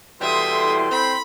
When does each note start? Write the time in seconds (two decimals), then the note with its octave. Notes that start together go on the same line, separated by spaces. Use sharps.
0.21 B2 E3 G3 E4 A4 E5 C6 D#6
0.91 C4 B5